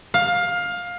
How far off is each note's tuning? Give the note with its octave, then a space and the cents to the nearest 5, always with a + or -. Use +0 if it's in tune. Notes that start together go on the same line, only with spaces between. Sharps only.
F5 +20